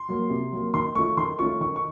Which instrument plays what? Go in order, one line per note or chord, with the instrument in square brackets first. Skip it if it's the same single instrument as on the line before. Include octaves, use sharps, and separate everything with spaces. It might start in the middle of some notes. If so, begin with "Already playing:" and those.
Already playing: [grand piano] C6
[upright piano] F#3 A#3
C3
F#3 A#3
[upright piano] D#3 [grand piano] C6
[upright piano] A3 C#4 F4 [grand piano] C#6
[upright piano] D#3 [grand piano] C6
[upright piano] A3 C#4 F4 [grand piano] C#6
[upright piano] D#3 [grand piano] C#6
[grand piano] C#6